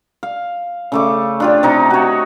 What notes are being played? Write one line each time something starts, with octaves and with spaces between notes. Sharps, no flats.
F5
C#3 A3 D6
D4 F4 G4
C3 D#4
F#4 C#5